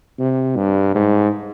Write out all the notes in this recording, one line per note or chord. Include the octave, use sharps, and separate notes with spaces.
C3
G2
G#2